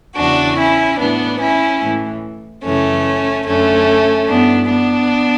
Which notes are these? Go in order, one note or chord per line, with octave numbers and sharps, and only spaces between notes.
E2 C#3 E3 D4 F#4
C#4 E4
A2 E3 B3 D4
C#4 E4
A2 E3
F#2 C#3 E3 A3 C#4
F#2 D3 A3 C#4
G2 E3 B3 D4
B3 D4